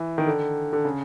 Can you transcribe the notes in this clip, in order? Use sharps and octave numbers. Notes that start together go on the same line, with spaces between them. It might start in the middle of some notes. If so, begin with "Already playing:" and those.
Already playing: E3
D#3
D3
D3
C#3